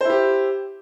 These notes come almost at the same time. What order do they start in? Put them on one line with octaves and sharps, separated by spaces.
C5 E4 G4